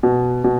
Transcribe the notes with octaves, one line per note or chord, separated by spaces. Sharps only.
B2
B2